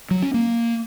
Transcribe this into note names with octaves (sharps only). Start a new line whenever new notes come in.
F#3
C#4
A#3